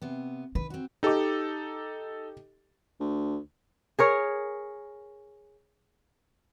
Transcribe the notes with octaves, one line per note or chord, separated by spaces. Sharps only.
C3 B3
D#3 B4
C4 F#4
D#4 G4 A4 D#5 D6
D2
G#4 A#4 C#5